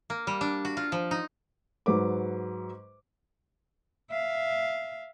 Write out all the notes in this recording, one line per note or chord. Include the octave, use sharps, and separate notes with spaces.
A#3
G3
D4
F#4
F4
F3
D#4
G#2 F#3 B4 D6
E5 F5